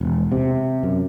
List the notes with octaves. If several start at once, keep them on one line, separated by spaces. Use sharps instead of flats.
E1
C3
F#2